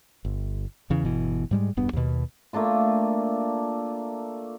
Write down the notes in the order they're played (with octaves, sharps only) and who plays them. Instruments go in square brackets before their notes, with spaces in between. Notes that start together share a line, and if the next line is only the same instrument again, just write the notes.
[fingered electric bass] G1
E2 C#3 E3
G1 B2 E3
G#2 G3 G#3
E1 G2 B3
D#2 B2
[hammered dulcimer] A3 A#3 D4 F4